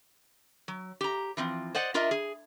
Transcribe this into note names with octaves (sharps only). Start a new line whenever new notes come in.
F#3
G4 A#5
E3 F3 C4
C5 D5 D#5 F#5
D4 F4 A#4 D#5 E5
G#4